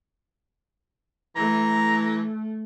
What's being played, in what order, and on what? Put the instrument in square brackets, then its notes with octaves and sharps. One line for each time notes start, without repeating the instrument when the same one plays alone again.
[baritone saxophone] E3 [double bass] A3 [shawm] A#5